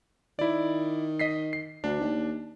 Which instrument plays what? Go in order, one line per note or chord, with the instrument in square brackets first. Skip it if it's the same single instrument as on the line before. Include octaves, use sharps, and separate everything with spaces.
[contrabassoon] D#3 [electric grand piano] E4 D5
[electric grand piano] D#5 B6 C7
C7
[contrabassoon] D2 [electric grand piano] D4
[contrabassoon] D#2